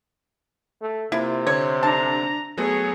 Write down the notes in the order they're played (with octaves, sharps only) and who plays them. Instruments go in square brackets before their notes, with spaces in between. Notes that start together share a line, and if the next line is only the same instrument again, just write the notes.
[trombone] A3
[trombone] C3 [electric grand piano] A#3 F4 [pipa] E4
[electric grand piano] D3 C4 [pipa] C#5
[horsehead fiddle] D4 A#5 [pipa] A5
[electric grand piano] F#3 A3 B3 [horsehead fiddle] G#4 C#5